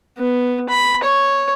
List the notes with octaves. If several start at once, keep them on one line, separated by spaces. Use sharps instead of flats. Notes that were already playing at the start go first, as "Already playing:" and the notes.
B3
B5
C#5